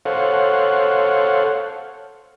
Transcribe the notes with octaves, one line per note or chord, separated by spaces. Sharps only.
A4 C5 C#5 F5 F#5